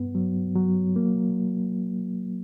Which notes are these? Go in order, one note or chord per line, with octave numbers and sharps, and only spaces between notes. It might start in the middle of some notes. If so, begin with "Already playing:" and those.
Already playing: G2 B3
F#3
F#3
A#3